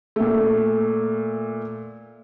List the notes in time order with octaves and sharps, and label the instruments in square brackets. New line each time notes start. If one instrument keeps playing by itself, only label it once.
[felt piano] A#2 A3